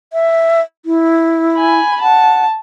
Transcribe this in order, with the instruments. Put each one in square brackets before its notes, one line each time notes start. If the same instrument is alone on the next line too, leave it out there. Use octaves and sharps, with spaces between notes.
[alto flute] E5
E4
[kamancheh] G#5 B5
[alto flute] F#5 [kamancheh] A5